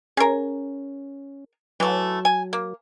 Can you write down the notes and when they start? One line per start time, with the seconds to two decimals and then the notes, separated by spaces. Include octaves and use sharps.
0.17 C#4 G#4 A#4
1.80 E3 F#3 A3
2.25 G#5
2.53 A#3